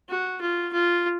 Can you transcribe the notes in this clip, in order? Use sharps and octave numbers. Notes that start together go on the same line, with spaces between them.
F#4
F4
F4